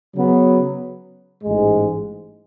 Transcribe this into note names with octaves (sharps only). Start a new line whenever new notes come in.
C#3 F#3 B3
A1 G#2 G#3